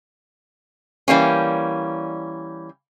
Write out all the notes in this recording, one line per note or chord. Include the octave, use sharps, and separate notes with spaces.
E3 G3 A#3 C#4